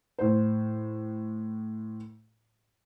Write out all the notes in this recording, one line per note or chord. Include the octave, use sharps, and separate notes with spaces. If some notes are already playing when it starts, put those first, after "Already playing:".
A2 C5